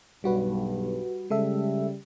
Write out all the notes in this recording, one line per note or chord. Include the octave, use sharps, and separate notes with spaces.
B1 G2 G3 F#4 B4
C#3 G3 G#3 A4 E5